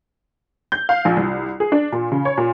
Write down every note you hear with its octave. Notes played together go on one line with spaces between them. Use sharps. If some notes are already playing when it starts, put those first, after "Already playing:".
G6
F5
A#1
C2
G#4
D4
A#2
C#3
C#5
A#2